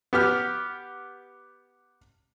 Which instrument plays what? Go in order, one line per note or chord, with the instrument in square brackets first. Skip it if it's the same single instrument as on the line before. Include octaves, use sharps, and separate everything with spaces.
[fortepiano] B3 G4 F6